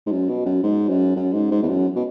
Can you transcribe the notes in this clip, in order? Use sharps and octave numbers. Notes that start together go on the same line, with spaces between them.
G#2
F#2
B2
F#2
G#2
F#2
F#2
G#2
G#2
E2
F#2
B2